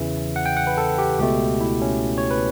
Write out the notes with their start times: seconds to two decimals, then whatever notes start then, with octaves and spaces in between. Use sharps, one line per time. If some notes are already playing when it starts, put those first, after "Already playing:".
Already playing: E2 C#3 E3 E5
0.36 F#5
0.46 G5
0.57 F#5
0.67 B4
0.77 A4
0.98 G4
1.19 C#2 B2 A3 G4
1.61 E4
1.82 C#4
2.18 C#5
2.31 B4